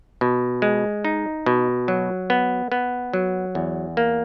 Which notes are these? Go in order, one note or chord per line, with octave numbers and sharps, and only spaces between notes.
B2
G#3
D#4
B2
F#3
B3
B3
F#3
E2
A#3